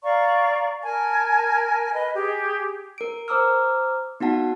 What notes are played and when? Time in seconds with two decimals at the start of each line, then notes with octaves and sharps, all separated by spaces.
0.04 D5 F5 A#5 C#6
0.82 A#4 G#5 A5
1.93 B4 D#5
2.14 G4 G#4
2.98 A#4 D7
3.28 C5 A#5 D6 E6 F6
4.20 B3 D#4 F#4 F#5 A5